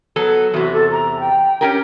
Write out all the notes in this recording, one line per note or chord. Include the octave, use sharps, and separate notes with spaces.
F#3 B3 A4
E2 C3 F#4
A4
A#5
G5
C#4 G4 A#4